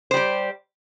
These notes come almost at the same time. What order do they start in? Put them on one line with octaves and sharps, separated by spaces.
C5 G3 G4